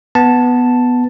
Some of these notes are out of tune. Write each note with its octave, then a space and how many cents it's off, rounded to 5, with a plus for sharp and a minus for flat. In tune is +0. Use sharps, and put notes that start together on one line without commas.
B3 +0 A5 +0